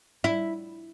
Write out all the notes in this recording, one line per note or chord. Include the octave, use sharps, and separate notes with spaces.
E4